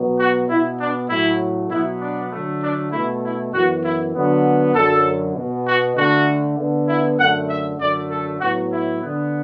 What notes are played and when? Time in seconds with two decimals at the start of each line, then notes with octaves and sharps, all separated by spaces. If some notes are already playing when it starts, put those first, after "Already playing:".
Already playing: B2 F#3 B3
0.18 F#4
0.48 B2 B3 E4
0.78 D4
1.10 A2 F#3 A3 E4
1.70 B2 F#3 B3 E4
2.01 D4
2.31 D3 F#3 A3
2.62 D4
2.92 A3 E4
2.97 B2
3.23 E4
3.53 F#2 E3 B3 F#4
3.83 E4
4.14 D3 F#3 B3
4.75 F#2 D3 F#3 A4
5.37 B2 B3
5.66 F#4
5.97 D3 A3 F#4
6.58 D3 B3
6.88 E4
7.19 F#2 D3 A3 F#5
7.49 E5
7.79 F#2 D3 F#3 A3 D5
8.10 A4
8.40 A2 F#3 B3 F#4
8.71 E4
9.01 D3 B3